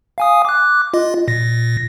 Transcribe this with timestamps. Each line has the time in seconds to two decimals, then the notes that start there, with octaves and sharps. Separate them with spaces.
0.18 F5 G#5 D#6
0.45 D6 F#6
0.94 F4 D#5
1.28 A#2 A#6